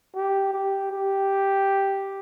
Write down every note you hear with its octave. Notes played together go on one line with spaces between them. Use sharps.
G4
G4
G4